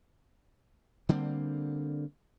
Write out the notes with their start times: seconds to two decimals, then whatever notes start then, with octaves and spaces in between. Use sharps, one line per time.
1.09 D3 G3 A#3 C4